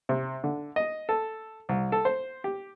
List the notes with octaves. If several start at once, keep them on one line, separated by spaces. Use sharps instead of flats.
C3
D3
D#5
A4
C2
A4
C5
G4